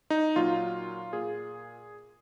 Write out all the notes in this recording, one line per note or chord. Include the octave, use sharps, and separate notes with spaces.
D#4
A#2 F#3 F4
A#2 G#4